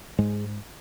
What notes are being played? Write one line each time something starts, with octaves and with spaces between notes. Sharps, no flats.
G#2 G#3